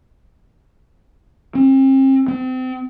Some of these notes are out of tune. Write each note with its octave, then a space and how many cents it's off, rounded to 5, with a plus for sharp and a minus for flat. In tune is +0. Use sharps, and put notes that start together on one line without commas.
C4 +40
C4 -30